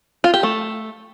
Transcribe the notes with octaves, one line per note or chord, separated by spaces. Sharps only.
F4
G4
A3